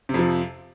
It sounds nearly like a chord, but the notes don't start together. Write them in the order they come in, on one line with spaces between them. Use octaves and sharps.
C3 F2 F3